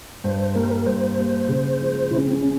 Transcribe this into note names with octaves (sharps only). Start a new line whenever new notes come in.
G2 C5
C5
G3 A#3 A#4
C5
A#4
G2 C5
G3 A#3
C#3
F3 G#3
C#3 E4
C#4
C4
C#4
G#3